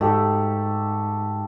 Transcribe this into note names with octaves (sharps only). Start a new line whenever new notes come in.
G#2 A3 G4 A4